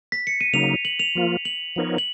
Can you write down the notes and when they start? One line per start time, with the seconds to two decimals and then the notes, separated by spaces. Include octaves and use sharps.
0.12 B6
0.27 C#7
0.41 D#7
0.53 C#3 F#3 A#3 D#4 F7
0.85 F#7
0.99 F7
1.15 F3 A#3 F4
1.45 F#7
1.76 F3 B3 D#4 A#4 C#5
1.98 F#7